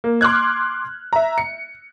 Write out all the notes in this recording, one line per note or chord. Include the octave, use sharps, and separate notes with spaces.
A#3
C6 D6 F6 F#6 G#6
E5 A#5
C#7